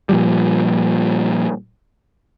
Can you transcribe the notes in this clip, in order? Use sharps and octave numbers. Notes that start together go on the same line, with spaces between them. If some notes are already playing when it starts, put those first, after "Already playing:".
A#2 F3 G3